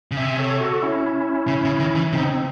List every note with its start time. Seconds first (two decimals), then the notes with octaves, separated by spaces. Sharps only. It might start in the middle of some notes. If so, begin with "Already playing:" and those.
0.11 C#3
0.17 C3 E5 G#5
0.39 A4 C#5
0.60 F#4 A4
0.82 C#4 E4
1.48 C#3
1.64 C#3
1.80 D#3
1.96 E3
2.13 C#3 C4 D#4
2.29 C4